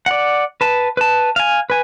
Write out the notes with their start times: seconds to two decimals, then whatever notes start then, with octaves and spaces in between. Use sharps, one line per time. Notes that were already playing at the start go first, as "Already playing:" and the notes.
0.06 D5 F#5
0.61 B4 A5
0.97 B4 A5
1.36 F5 G#5
1.70 B4 G#5